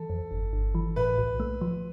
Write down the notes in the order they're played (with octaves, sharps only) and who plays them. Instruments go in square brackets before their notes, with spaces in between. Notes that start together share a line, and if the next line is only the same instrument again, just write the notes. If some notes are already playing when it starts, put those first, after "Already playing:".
Already playing: [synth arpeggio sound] E3 [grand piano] A4
[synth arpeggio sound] F2
G1
G1
E3
[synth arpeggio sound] A2 [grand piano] B4
[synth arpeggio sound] B1
A3
F3